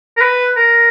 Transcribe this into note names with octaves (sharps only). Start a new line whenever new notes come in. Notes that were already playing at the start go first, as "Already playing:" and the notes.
A#4
B4
A#4